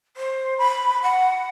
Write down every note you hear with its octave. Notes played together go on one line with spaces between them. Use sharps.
C5
B5
F#5